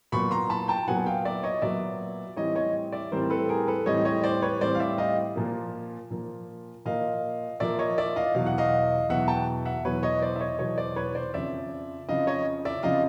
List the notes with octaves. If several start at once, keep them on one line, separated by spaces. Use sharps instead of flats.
A#2 F#3 B3 B5 C#6
A#5 C6
A5 B5
G5 A5
A#2 F#3 B3 F#5 G#5
F5 G5
D5 E5
C#5 D#5
A#2 F#3 B3 D5 E5
A2 E3 G3 C4 C#5 D#5
C#5 D#5
D5 E5
A2 E3 G3 C4 A#4 C5
A4 B4
G#4 A#4
A4 B4
A2 E3 G3 C4 C#5 D#5
C#5 D#5
C5 D5
B4 C#5
A2 E3 G3 C4 C5 D5
F5
D5 E5
D#5 F5
A#2 F3 A#3
A#2 F3 A#3
A#2 F3 A#3 D#5 F5
A#2 F3 A#3 D5 E5
C#5 D#5
D5 E5
D#5 F5
E2 B2 F#3 F5
F#5
D#5 F5
E2 B2 F#3 E5 F#5
G5 A5
E5 F#5
E2 B2 F#3 B4 C#5
C#5 D#5
C5 D5
E5
C#5 D#5
E2 B2 F#3 C#5 D#5
C5 D5
B4 C#5
C5 D5
F2 C#3 F3 D5 E5
F2 C#3 F3 D#5 F5
C#5 D#5
D5 E5
F2 C#3 F3 D#5 F5